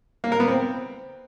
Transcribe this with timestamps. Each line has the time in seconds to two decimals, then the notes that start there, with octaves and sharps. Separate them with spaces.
0.24 A#3
0.32 A#4
0.40 B3
0.48 C4